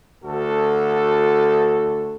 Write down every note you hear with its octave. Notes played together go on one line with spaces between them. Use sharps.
D2 F#4 A4